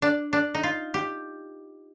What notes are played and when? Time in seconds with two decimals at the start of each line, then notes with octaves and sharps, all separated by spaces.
0.02 D4
0.33 D4
0.55 D#4
0.63 F4
0.94 G4